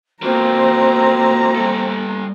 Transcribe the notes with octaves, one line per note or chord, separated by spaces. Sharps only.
A#3 C4 F4 F#4 A#4 A#5
G3 A4